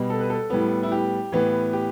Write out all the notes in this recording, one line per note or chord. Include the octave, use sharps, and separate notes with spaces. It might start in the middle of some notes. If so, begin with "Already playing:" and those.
Already playing: B2 G3 B3
A4
B4
A4
A2 G3 B3
E4
G4
A2 E3 B3
G4